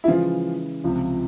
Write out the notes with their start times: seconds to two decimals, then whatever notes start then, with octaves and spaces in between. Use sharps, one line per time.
0.04 E4
0.07 C#3 E3 F3 G#3 F4
0.84 C#2 C3 F3